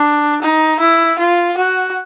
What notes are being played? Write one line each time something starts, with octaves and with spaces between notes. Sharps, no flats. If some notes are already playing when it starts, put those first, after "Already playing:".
Already playing: D4
D#4
E4
F4
F#4